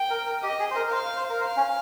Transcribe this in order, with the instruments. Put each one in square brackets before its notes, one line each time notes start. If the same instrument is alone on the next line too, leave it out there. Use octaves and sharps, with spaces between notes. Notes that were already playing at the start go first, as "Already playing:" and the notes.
Already playing: [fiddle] G5
[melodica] A#4
A#4
[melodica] G4 [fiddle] D#5
[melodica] G#4
C5
A#4
A#4
[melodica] C5 [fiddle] F5
[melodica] C5
A#4
[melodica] C5 [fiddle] F5
[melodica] C#4